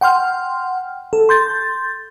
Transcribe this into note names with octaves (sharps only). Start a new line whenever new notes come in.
F#5 G5 C6 F6
A4
C6 G6 A6